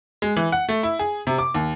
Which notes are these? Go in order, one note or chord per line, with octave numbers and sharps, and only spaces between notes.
G#3
E3
F#5
A3
E4
G#4
C3
D6
D#2